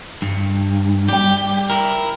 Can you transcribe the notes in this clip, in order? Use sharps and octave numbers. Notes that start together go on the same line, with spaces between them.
G2
G3 G4 G5
E4 A#4